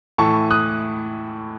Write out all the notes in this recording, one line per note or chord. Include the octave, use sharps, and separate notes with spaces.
A2 E3 A5 C#6
D#6 F#6